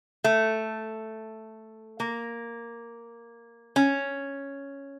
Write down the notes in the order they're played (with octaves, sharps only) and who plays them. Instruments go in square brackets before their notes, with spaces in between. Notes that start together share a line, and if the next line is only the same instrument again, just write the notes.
[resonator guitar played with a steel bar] A3
A#3
C#4